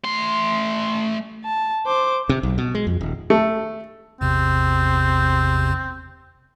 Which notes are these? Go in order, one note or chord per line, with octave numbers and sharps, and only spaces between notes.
A3 C6
A5
C5 D6
C3
B1
B2
G#3
F2
D#1
A3
A1 E2 C3 C4